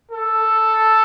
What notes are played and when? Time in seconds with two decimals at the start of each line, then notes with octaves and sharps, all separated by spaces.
0.11 A4